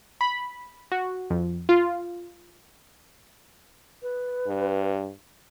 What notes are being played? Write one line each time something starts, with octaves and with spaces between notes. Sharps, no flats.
B5
F#4
F2
F4
B4
G2